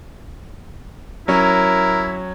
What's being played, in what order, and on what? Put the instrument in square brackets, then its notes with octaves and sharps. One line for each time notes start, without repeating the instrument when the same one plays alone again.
[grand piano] F#3 C#4 [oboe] E4 [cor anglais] A#4